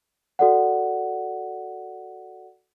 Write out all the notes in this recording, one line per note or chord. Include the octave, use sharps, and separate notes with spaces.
F#4 A4 D5 F#5